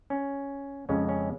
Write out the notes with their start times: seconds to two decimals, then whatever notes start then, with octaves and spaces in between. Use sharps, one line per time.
0.10 C#4
0.89 F2 C#3 G#3 C#4
1.09 C#4